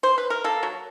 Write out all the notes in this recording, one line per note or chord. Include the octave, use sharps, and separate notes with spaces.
C5
B4
A#4
A#3 A4
F#3